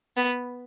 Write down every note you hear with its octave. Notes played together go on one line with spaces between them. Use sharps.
B3